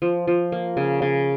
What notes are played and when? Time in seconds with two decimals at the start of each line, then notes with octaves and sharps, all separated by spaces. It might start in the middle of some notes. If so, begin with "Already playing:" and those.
0.02 F3
0.27 F3
0.52 A#3
0.77 C#3
1.02 C#3